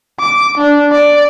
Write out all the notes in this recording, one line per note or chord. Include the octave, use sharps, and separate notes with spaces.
D6
D4
D5